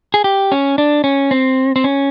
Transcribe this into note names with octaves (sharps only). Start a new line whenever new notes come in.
G#4
G4
C#4
D4
C#4
C4
C4
C#4